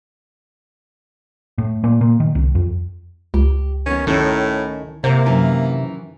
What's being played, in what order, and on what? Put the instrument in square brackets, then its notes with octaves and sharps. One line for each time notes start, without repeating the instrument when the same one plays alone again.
[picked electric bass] A2
A#2
A#2
D#3
C2
F2
[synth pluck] C#2 [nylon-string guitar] G4
[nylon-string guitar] D#3 B3 [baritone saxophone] C#4
[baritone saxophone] A2 [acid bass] D#3 [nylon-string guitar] C#4 A4
[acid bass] C3 [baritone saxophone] A#3 [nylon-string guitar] E4 A#4 F#5 [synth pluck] C5
[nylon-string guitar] F#2 D#3 E3